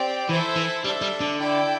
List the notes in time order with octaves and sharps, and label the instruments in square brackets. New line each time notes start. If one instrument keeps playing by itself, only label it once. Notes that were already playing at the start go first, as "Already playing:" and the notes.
Already playing: [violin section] C4 G4 D5 G5
[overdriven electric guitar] E3 [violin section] E4 A4 C5 E5
[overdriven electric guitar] E3
[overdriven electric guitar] G3 [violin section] D4 A4 E5
[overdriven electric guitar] G3
D3
[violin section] E4 A4 D5 G5